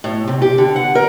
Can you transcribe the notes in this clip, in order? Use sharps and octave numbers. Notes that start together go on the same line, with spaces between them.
A2
C3
G4
D3
F#5
A#4